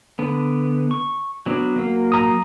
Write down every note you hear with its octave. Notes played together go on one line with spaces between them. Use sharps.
D3 B3
C#6
F#3 B3 D4
F#3 A#3
A#5 D#6